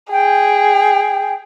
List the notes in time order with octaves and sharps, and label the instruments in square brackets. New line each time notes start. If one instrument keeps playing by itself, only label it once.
[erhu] G#4 [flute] G5